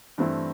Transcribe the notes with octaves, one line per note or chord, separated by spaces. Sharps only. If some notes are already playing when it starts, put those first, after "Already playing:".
G2 E3 A3 C4 E4